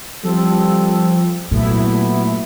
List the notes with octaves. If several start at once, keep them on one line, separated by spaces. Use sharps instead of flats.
F3 G3 C4 A4
A#2 F#3 A3 B3 E4